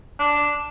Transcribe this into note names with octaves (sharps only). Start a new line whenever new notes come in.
D4